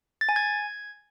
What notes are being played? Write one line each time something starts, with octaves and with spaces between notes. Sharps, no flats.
A6
G#5
G#6